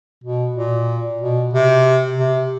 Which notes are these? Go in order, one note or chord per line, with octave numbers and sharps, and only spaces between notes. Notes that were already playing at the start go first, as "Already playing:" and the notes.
B2
A#2
B2
C3
C3